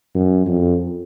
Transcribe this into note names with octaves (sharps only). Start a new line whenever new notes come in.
F#2
F2